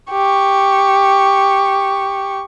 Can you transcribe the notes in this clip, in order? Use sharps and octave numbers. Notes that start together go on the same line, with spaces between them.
G4 C#6